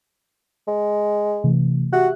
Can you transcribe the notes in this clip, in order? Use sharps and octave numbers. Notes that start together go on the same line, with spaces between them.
G#3
C3 E3 A3
F#4 G4 E5 F#6